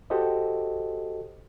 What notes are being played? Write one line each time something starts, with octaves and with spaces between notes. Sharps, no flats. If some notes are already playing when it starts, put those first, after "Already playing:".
F#4 G4 A4 C5 D#5